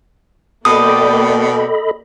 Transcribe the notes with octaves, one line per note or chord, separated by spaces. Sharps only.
B2 A#3 A4 D5 D#5 G5 B5 D#6